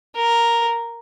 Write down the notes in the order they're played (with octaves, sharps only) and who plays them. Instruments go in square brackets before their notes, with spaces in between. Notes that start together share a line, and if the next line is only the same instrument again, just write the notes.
[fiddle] A#4